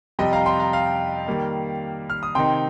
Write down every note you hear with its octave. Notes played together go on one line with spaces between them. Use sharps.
F2 C3 G3 D#5 G5
F5 A#5
G5 C6
F5 A#5
F5
D#3 G3 A#3
F6
D#6
C3 D#3 C4 D#4 G5 C6